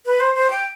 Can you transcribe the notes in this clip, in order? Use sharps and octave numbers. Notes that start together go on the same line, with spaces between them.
B4
C5
C5
G5